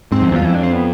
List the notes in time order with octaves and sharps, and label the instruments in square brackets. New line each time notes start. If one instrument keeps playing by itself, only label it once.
[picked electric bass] G#2 [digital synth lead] C4
[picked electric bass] F2
[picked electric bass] E2 [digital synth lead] F4
[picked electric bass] F2 [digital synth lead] E4
[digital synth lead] D4
C4
B3